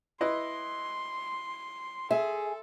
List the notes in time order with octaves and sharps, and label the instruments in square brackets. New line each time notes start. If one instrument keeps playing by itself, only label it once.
[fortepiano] E4 B4 D#5 [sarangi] C6
[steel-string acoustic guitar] G#4 [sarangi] A4 [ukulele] E5